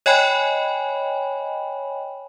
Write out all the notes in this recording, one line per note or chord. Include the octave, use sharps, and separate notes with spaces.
C#5 D#5 G5 G#5 B5